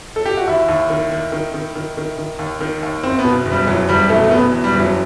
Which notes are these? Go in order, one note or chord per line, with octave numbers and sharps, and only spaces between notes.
A4
G4
F#4
D#2 E4
D#2
D#3
D#3
D#3
D#3
D#3
D#3
D#3
D#2
D#3
D#2
F#1 C4
B3
B2
F#1
G3
E2 F#3
F#1 G3
B2 A3
A3
B2 B3
E2
G3
F#1
F#3